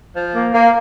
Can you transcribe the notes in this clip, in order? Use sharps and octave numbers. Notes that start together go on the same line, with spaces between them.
F3
A#3
A#3